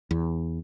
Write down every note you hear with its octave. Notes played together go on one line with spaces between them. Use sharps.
E2